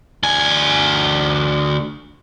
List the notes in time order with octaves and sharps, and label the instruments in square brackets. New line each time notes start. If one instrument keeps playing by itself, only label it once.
[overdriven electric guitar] D2 G#5